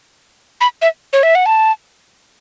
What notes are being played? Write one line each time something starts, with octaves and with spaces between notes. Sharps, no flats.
B5
E5
C#5
E5
F#5
A5